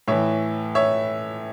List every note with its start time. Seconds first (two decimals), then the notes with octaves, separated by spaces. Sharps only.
0.08 A2 E3 C#5 E5
0.75 C#5 E5